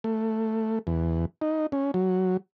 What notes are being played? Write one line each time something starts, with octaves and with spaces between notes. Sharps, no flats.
A3
E2
D#4
C#4
F#3